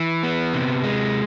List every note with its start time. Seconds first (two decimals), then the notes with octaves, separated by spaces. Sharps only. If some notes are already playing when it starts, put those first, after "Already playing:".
Already playing: E3
0.23 B3
0.54 C3
0.84 G#3